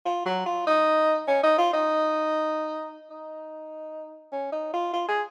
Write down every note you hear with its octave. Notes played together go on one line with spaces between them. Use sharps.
F4
F#3
F4
D#4
C#4
D#4
F4
D#4
D#4
C#4
D#4
F4
F4
G#4